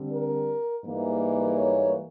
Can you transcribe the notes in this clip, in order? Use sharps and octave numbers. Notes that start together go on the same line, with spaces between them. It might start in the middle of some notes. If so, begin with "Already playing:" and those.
Already playing: D3 G3 C4
A#4
G#2 E3 G3 A#3
C#5